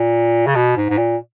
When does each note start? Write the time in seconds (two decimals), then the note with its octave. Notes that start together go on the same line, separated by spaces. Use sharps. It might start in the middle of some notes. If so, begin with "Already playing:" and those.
Already playing: A#2
0.47 C#3
0.56 B2
0.77 G#2
0.90 G#2
0.97 A#2